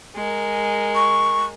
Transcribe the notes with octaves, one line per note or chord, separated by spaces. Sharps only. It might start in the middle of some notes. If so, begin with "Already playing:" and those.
G#3 A#4
C#6